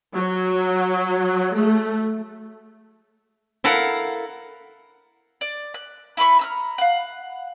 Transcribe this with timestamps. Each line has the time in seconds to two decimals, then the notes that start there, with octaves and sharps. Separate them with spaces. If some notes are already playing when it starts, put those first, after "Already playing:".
0.15 F#3
1.54 A3
3.64 E4 A4 A#4 F5 F#5
5.41 D5
5.74 F#6
6.17 E4 B4 B5 C#6
6.39 A#5 E6 F6
6.78 F5 F#5